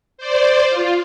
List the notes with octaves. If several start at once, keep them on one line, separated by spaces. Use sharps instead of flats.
C5 D5
F4